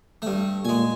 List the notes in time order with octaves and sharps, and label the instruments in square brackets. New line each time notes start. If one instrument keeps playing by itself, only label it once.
[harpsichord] G2 A3
[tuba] A#2 [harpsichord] G#3 G#5